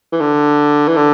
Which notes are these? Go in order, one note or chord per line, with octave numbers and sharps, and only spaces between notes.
E3
D3
E3
D3